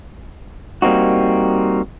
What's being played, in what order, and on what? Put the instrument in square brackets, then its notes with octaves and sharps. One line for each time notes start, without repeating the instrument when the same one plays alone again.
[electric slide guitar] G3 A#3 C4 D#4 F#4